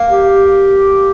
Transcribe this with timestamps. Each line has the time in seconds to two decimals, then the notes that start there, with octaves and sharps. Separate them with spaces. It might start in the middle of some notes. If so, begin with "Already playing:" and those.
Already playing: A#3
0.09 G4